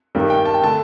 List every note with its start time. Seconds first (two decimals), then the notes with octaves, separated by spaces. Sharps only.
0.15 G2 D#3 G3 A#3
0.30 G5
0.45 A5
0.54 G5
0.63 D3 A3 A5